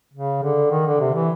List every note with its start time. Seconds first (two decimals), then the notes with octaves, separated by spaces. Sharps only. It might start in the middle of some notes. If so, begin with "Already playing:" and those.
0.13 C#3
0.42 D3
0.71 D#3
0.86 D3
1.00 C3
1.15 E3